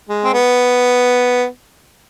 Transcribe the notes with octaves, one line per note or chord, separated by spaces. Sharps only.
G#3
C4
B3